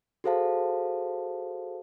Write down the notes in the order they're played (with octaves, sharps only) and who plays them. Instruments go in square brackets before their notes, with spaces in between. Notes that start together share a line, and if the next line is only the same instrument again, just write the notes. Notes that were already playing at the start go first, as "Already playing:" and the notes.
[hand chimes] F#4 G#4 A4 C5 F5 A5